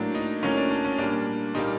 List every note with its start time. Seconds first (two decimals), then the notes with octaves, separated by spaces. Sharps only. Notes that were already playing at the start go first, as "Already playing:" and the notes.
Already playing: A2 F#3 A#3 D4
0.15 D#4
0.43 A2 F#3 A#3 C#4
0.57 D4
0.71 D4
0.85 C#4
0.98 A#2 G3 A#3 D4
1.54 A#2 G3 A#3 D#4